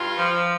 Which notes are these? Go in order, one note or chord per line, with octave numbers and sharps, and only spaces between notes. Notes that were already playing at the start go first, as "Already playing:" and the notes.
Already playing: G2 F4
F3